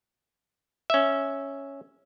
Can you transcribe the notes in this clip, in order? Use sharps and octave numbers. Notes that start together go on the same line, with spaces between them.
C#4 E5